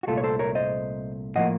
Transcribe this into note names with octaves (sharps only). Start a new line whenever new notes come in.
F#4
C2 A#2 A3 F4 A4
C#5
A4 C5
A#4 C#5
C5 D#5
A2 F3 A#3 D#5 F#5